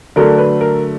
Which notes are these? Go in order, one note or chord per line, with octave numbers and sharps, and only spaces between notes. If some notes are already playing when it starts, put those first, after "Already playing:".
D3 F#3 A3 D4 A#4
B4
A#4